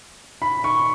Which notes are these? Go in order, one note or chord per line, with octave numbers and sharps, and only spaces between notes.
B5
C#6